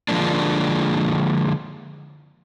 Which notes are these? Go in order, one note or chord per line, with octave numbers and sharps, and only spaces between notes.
D3 F3 G#3 A#3 D4